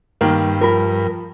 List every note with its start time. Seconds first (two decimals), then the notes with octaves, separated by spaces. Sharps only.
0.21 G2 D#3 A#3
0.61 F3 A#4 B5